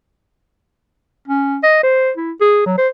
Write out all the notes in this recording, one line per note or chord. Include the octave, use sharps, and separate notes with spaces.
C#4
D#5
C5
E4
G#4
F#3
C5